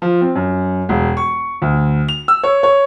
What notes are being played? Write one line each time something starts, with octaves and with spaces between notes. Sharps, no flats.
F3
C4
F#2
E1
C#6
D2
F7
E6
C#5
C#5